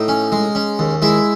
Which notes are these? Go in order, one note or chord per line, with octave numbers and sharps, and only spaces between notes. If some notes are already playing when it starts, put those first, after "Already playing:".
Already playing: A2 D#4
C#4
G#3
C#4
D#2
G#3 E4